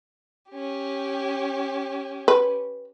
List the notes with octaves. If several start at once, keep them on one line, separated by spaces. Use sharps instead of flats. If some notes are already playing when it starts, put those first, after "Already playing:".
C#4 G4
B4